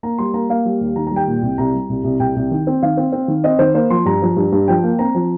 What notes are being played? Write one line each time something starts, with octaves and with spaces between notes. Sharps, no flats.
A#3 A#5
G3 C6
A#3 A#5
A#3 F5
G3
D#2
D#3 A#5
G3 A#5
G5
A#2
C2
C2 A#5
G3
C2
C2
C2 G5
C2
D#3
C4
D#3 F5
C4
C4
D#3
C4 D#5
D#3 C5
A#3 C5
F3 C6
G2 A#5
F3
G2
G2
F3 G5
A#3
C4 A#5
F3